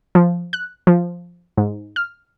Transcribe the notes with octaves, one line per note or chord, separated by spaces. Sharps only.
F3
F#6
F3
G#2
F6